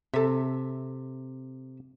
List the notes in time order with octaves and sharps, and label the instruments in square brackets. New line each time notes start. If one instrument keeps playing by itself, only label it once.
[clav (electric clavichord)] C3 [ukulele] A4 E5